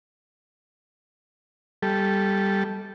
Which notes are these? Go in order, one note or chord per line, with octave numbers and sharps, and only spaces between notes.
G3 A4